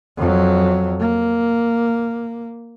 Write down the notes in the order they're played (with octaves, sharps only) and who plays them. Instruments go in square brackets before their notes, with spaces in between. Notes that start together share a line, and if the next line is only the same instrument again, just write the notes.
[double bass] F2 F#3
A#3